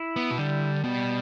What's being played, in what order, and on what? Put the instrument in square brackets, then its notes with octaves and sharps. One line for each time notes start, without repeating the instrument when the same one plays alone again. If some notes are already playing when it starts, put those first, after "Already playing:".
Already playing: [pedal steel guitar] E4
[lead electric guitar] B3
B2
[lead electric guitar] D3 [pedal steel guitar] G3
[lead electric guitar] B2 [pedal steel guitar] G3